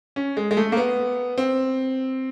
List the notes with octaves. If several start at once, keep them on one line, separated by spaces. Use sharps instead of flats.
C#4
G#3
G#3
A3
A#3
B3
C4